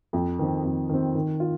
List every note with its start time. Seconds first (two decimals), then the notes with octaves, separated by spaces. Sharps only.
0.13 F2
0.39 D#3 C4
0.65 F2
0.89 D#3 C4
1.15 D#3
1.40 F4